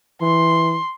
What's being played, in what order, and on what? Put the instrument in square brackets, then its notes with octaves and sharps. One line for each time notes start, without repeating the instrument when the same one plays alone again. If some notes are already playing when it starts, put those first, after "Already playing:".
[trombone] E3 [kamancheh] C6